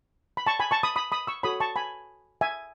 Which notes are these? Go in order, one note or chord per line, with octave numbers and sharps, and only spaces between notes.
B5
A5 C#6
G#5 B5
A5 C#6
B5 D#6
B5 D#6
B5 D#6
C#6 E6
F#4 A4 C#5 B5 D#6
A5 C#6
G#5 B5
E5 G#5